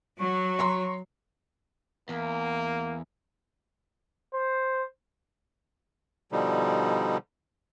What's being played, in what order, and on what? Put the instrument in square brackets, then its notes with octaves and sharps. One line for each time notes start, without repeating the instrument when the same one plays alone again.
[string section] F#3 [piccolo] C#6
[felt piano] C#5 A#5 C6
[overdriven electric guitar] E2 [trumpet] A#3
[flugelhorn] C5
[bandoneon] B2 D3 F3 G3 D#4